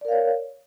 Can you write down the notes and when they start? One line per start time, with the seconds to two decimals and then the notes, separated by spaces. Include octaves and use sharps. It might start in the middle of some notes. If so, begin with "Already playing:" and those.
0.01 D5
0.05 A#4
0.08 F5
0.12 C#5